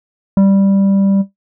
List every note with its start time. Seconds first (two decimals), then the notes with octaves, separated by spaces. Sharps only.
0.37 G3